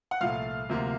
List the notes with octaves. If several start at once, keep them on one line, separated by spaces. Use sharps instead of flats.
F#5
C2 A#2 F3 A3 F5
D2 C3 F3 A#3